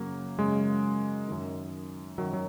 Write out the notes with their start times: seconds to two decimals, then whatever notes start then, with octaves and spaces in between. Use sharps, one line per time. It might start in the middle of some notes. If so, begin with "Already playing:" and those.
Already playing: F#2 C#3 F#3 A#3
0.39 F#2 C#3 G#3
1.28 F#2 D#3
2.18 F#2 D#3 F#3
2.33 F#3